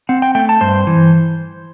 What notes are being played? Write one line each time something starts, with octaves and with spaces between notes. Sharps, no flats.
C4 F#5
G5
A3 G5
A5
G2 C5
E3